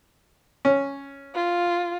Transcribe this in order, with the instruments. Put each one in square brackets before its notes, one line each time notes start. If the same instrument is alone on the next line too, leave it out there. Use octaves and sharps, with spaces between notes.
[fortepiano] C#4
[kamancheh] F4